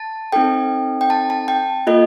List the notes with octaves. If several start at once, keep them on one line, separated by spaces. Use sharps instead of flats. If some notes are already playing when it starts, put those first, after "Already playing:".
Already playing: A5
C4 D#4 A4 G5
G5
A5
A5
G5
A#3 F4 A4 D#5